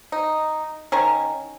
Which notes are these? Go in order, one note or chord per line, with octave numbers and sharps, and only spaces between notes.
D#4
D#3 C#4 A#5 C#6